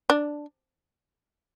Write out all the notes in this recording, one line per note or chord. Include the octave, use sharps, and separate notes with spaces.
D4